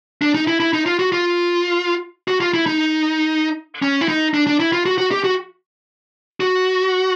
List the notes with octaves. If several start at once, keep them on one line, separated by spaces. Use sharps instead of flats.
D4
D#4
E4
E4
D#4
F4
F#4
F4
F#4
F4
E4
D#4
C#4
E4
D#4
D4
D4
E4
F4
F#4
F#4
G4
F#4
F#4